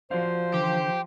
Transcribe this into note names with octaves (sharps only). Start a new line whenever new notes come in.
F3 F#4 C5 D5 F5
D3 E3 G4